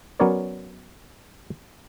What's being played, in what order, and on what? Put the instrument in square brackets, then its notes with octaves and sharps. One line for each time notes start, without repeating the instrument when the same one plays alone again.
[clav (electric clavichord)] F#3 B3 C#4 A#4 C#5 D5